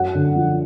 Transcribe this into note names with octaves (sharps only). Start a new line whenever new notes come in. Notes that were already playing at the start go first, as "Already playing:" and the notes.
Already playing: F#2 F#5
D3
F3